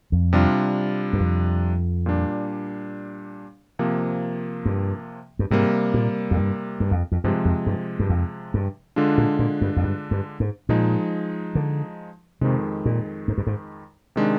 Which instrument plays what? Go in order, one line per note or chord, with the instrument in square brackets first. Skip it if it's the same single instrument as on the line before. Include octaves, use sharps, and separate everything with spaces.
[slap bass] F2
[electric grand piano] C3 G3 D4 F4
[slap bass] G2
F2
[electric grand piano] A#2 G3 D4
C3 F3 A#3
[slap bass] G2
G2
[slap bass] G#2 [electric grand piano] C3 G3 A#3
[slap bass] A#2
F2
G2
G2
F2
F2
[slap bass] G2 [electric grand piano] C3 F3 G#3
[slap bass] F2
G2
G2
F2
G2
[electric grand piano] D3 G#3 D4 F4
[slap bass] A#2
A#2
G2
F2
G2
G2
G#2
[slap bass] A#2 [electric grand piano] F3 G#3 D#4
[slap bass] D3
[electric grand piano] F2 D#3 G#3 [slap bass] C3
[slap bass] A#2
G#2
G2
G#2
[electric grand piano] C3 D#3 G#3 D4